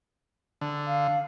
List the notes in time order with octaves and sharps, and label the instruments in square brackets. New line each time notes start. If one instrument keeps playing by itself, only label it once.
[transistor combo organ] D3
[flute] F5